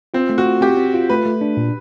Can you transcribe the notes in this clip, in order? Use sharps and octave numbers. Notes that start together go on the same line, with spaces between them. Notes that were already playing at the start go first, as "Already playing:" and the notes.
C4 F4
A3
F#4
F4
C4 G4
C4
F4
A3 B4
A3
D4
A#2